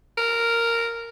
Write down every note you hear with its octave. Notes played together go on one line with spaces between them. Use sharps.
A#4